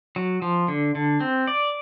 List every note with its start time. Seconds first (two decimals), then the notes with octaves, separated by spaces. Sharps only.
0.16 F#3
0.42 F3
0.68 D3
0.95 D3
1.20 C4
1.47 D5